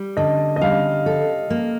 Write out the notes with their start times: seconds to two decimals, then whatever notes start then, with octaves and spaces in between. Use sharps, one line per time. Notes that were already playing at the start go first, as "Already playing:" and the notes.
Already playing: G3
0.17 D3 D#5
0.56 D#5
0.61 G3 F5
1.06 A4
1.50 A#3